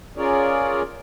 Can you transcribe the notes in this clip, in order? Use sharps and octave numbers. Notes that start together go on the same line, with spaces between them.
C#4 F4 G#4 A#4 C#5 D5